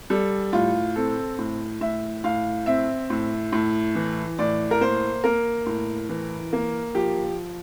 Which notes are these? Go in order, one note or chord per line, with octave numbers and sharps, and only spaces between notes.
G3 A4
A2 F4
C4 A4
A2
A2 E5
A2 F5
C4 E5
A2
A2
E3
A2 D5
A#4
A#3 C5
A#3 A#4
A2
E3
A#3
F3 G4